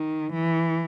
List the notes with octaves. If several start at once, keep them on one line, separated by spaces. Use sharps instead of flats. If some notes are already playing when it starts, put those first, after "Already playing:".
Already playing: D#3
E3